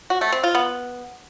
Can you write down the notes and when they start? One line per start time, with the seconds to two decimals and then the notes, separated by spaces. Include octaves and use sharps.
0.10 F#4
0.21 A3
0.32 C4
0.44 F4
0.55 B3